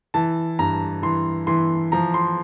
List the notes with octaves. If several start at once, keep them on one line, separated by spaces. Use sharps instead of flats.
E3 A5
G2 A#5
E3 C6
E3 C6
F3 A#5
C6